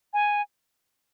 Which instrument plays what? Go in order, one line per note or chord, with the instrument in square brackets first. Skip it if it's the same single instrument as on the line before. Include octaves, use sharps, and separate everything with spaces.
[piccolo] G#5